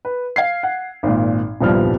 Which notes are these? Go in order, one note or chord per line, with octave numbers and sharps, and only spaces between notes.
B4
F5 G#6 C7
F#5
G#1 A#2
D#1 C2 G2 F3 B3 F6